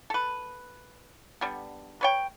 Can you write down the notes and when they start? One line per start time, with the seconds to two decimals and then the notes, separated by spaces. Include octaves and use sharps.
0.10 A4 B4
1.41 D3 G3 B3
2.01 B4 C#5 G5